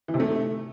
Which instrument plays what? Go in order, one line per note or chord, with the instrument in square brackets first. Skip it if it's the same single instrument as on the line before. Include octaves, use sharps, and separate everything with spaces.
[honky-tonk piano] E3
C3
A3